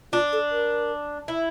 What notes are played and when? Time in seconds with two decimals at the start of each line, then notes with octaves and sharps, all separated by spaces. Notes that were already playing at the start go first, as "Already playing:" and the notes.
0.12 D4 F4
0.33 A4
0.51 A#4
1.28 E4